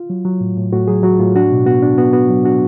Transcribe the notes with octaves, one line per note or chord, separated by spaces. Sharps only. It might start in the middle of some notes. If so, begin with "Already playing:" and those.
Already playing: F4
F#3
F#3
A2
A2
A2 F#4
F#3 G#4
F#3 F#4
A2 F4
D4 F#4
B2
B3 F#4
D4
B3 F#4
B3 F#4
F#3
D4 F#4